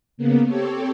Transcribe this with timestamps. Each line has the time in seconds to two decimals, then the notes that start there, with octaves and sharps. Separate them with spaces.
0.17 C#3 A#3 B3
0.46 C4 G4 A4 C#5